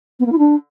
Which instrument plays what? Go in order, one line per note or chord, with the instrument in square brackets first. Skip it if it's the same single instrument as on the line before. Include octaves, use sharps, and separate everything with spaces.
[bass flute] B3
A#3
E4
D4